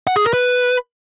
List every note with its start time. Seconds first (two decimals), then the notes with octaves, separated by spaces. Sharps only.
0.07 F#5
0.16 G#4
0.25 A#4
0.33 B4